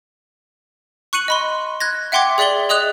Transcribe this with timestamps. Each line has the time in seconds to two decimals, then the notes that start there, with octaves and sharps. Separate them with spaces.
1.13 C#6 F#6 C#7 D#7 F#7
1.28 D#5 B5 C6
1.80 F#6 G#6 A#6
2.12 E5 F#5 G5 C6 D6 G#6
2.38 G#4 D5 E5 F#7 G7
2.69 G#4 D#5 D#6 F#6 F7